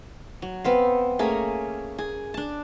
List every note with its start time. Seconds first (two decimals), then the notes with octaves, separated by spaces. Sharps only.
0.42 F#3
0.64 B3 C4 F5
1.19 A3 A#3 C#4 G#4
1.98 G#4
2.34 D4 A5